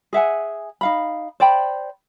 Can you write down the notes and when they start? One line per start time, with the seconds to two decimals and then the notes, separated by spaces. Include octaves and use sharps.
0.13 G#4 E5 F#5 G#5
0.81 D#4 F5 B5
1.40 C5 D5 G5 B5